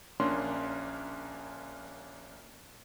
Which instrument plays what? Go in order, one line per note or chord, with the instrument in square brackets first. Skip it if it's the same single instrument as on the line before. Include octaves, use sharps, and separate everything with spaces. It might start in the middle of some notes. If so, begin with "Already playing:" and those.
[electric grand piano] A#1 A#3 C#4 D4 C6